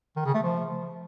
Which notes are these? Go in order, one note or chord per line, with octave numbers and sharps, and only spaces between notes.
D#3
C#3
A3
F3